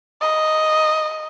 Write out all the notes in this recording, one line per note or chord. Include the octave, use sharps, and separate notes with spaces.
D#5